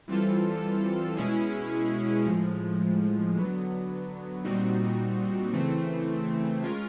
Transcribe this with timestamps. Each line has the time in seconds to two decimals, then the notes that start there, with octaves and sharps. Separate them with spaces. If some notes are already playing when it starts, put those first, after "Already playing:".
0.08 E3 G3 C4 F4 A4
1.17 B2 G#3 C#4 E4 G#4
2.26 A2 F3 G#3
3.36 D3 F#3 B3
4.44 A#2 G3 C4 D#4 F#4
5.53 C#3 E3 A3 C4
6.63 G#3 C#4 F4 A#4